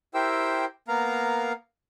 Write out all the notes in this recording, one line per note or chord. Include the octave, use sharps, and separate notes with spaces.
E4 G4 A#4 C5 G5 E6
A#3 B3 A#4 F5 A#5